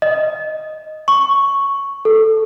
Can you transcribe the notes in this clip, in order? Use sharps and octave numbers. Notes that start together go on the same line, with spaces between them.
D#5
C#6
A4